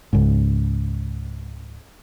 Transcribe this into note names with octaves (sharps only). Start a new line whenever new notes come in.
C#2 G#2